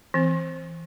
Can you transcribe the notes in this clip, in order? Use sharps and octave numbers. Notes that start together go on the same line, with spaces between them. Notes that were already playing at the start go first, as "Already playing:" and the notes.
E3 C4